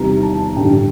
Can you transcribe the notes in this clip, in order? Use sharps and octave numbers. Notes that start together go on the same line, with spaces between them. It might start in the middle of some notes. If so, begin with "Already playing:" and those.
Already playing: E2 C3 D#3 G3 A#5
A5
A1 G2 D3 G3 G5